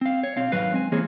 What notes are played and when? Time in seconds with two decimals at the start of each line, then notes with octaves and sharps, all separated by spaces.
0.01 C4 F5
0.23 C#5
0.37 B1 C4 F5
0.52 D#2 G#2 F#3 B4 F5
0.73 G#3 C4 G#5
0.92 E3 A#3 C4 G#4 C#5